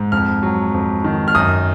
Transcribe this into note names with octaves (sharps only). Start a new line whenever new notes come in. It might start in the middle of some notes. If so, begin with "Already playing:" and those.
Already playing: G#2
F2 F6
F#3
F2
D#3
F6
F#2 D#6